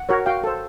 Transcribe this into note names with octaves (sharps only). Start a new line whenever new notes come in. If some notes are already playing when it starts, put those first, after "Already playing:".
Already playing: F#5
F#4 A#4 C#5
F#4 F5 G5
A4 C5